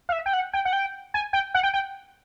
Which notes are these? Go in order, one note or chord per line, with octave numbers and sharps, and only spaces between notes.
F5
E5
G5
F#5
G5
F#5
G5
G#5
G5
F#5
G5
G5